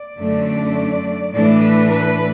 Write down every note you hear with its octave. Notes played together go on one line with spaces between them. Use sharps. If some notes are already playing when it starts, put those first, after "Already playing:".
Already playing: D5
F#2 D3 A3 D4
A2 E3 A3 D4 D5
B4
B4